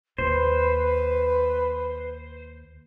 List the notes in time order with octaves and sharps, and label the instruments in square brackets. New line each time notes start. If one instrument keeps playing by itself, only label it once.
[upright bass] D#2 [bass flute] B4 [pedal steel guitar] C5